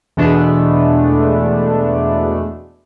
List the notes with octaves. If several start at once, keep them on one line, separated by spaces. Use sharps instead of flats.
E2 B2 G#3 A3 B3 D4